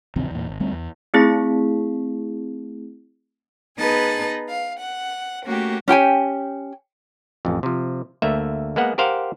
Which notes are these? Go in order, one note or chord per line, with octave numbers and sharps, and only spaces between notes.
A#1 E2 C#3 C4
E2 A#2
G#1
D2 G3 A3 C4
E2
A3 C4 E4 G#4 B6
B3 D#4 G#4 B4 A5
F5
F#5
A3 A#3 C#4 F#4 G4
C#4 G4 G5 G#5
A1 F2
C3 F3
D2 A3 A#3 E5
G#3 A#3 B3 F#5
G4 A#4 C5 F5 F#5